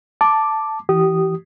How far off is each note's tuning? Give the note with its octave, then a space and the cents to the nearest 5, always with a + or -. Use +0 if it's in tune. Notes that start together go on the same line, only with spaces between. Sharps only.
A5 +0 D6 +0
E3 +5 G4 -30 D#6 -10